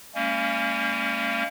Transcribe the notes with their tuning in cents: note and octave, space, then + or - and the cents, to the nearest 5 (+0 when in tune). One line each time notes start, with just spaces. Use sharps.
G3 +40 A#3 -35 C#4 +0